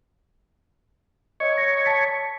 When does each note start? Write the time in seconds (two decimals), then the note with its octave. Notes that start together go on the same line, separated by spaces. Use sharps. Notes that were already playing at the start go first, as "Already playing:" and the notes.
1.40 C#5 D#5
1.58 A#6
1.86 A5 A6 B6